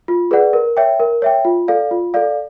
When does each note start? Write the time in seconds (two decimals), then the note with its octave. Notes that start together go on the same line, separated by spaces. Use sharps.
0.08 F4
0.31 G#4 B4 D5 F#5
0.53 A#4
0.77 C#5 E5 G5
1.00 A#4
1.22 C#5 E5 G5
1.45 F4
1.68 A4 D5 F5
1.91 F4
2.14 A4 D5 F5